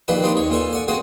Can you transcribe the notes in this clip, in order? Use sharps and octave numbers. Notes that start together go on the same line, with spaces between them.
A#1 D#3 A#3 D4 G4 B4
C4 D4 D#4 G4
D#2 C#5
A#2 F4 A4 G#5
D5 F#5 G#5
A#3 C4 C#4 F#4 G#4 F#5